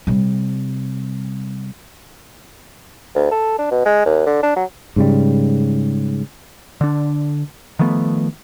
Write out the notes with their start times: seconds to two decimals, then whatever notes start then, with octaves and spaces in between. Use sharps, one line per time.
0.07 C3 G3
3.15 D2
3.31 A4
3.58 D4
3.71 B2
3.86 G#3
4.06 D#2
4.26 D3
4.43 D4
4.56 F#3
4.96 G#2 C#3 G3
6.81 D3 D4
7.79 D#3 F3 A3 B3